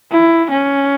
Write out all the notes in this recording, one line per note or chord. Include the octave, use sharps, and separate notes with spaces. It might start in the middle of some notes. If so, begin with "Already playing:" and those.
E4
C#4